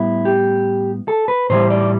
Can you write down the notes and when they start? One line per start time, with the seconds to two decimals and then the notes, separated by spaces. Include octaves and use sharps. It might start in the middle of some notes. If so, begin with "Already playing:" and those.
Already playing: A2 G3 B3 E4
0.25 G4
1.08 A4
1.28 B4
1.50 A2 E3 G3 C5
1.70 D5